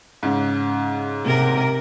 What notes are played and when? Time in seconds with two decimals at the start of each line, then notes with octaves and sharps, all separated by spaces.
0.23 G#2 C#3
1.25 C3 A#4